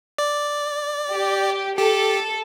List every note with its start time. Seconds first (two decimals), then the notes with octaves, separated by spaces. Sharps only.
0.18 D5
1.12 G4
1.78 G4 A4